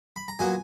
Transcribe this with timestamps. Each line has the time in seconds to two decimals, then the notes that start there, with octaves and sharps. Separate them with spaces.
0.16 B5
0.28 A#5
0.39 A#2 F#3 B3 G#5